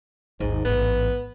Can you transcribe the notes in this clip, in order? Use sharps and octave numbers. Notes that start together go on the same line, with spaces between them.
G#1 D#2 G#2
A1 G#2 B3